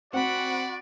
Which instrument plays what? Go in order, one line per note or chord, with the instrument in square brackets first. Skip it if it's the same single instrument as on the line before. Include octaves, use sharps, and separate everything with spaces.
[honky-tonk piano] C4 [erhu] F#4 [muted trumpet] D5 [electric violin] F#5 B5